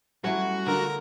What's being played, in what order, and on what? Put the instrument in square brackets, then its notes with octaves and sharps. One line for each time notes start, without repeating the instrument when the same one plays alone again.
[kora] F#3 A3 C#4 [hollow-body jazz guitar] G3 E4 [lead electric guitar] F#4
[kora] D3 F4 [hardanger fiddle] A#4